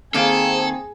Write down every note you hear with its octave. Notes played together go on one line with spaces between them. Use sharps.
D#3 A#3 C4 G#4 A4 F5